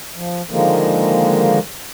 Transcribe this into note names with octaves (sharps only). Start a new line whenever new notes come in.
F3
D3 D#3 F3 G#3 A#3